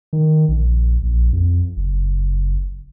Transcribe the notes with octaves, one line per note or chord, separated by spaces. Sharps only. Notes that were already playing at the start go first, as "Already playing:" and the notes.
D#3
A#1
A#1
F2
F#1